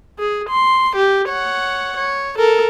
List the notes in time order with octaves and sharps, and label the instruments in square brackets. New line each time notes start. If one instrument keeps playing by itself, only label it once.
[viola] G#4
C6
G4
C#5 F#5
C#5
A4 A#4